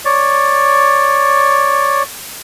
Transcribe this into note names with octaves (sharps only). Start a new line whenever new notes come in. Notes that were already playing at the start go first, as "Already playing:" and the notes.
C#5 D5